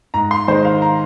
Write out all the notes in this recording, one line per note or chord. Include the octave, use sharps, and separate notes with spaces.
G#2 A#5
C6
D#3 G#3 C5
F5
A#5